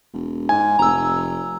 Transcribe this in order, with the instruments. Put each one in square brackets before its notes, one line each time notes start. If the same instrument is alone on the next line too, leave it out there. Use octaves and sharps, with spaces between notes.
[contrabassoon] E1
[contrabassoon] G#2 [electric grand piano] G#5
[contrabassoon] F1 [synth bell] A#5 E6